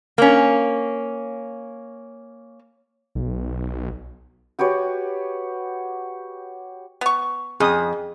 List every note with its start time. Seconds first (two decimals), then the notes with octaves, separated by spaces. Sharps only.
0.18 A#3 C#4
3.15 B1
4.59 F#4 G4 B4 C#5
7.01 B3 C#6
7.60 F2 G#4 D#6